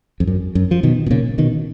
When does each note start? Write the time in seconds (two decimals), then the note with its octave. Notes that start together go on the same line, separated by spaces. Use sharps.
0.20 F2
0.27 F#2
0.55 F#2
0.71 F3
0.83 B2 D#3
1.06 B2
1.11 A#2 C#3
1.38 B2 D#3